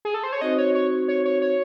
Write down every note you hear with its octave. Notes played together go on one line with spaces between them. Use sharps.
G#4
A4
C5
C#5
C4 D#4 F#4 C5 D#5
C#5
C#5
C#5
C#5
C#5